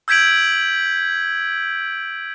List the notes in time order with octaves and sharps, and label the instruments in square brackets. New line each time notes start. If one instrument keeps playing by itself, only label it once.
[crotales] E6 G6 G#6 B6 D7 F#7